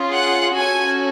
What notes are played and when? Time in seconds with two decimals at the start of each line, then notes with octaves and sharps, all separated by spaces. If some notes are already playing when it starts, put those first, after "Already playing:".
Already playing: C#4 F4 G#4
0.14 F#5
0.56 C#4 F#4 A4 G#5